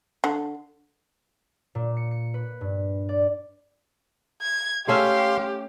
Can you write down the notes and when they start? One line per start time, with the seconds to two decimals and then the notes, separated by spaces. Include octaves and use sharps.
0.24 D3
1.75 A#2
1.97 C#7
2.11 C#7
2.34 B4
2.61 G2
3.09 D5
4.43 G#6
4.88 A3 C#4 G4 E5 F5 C6